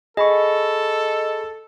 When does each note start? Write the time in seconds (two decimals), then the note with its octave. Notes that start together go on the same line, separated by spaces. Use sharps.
0.17 G#4 A4 D#5 B5 C#6